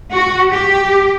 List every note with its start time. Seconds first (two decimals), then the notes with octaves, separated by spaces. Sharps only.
0.13 F#4
0.50 G4